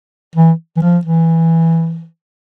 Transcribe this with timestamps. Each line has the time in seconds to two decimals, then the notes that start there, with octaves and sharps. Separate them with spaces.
0.35 E3
0.77 E3
0.82 F3
1.05 E3